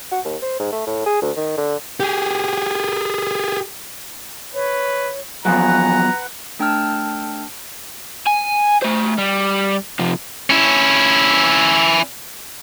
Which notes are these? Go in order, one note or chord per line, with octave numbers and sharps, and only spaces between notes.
F#4
D#2
C5
G#2
A3
A2
G#4
D2
D#3
D3
G4 G#4
B4 C#5
E2 F3 F#3 B4 F#5 G#5 A#5
A3 D4 G5 A5 E6 F6
G#5
A3 C5
G3
C3 F3
C#4 E4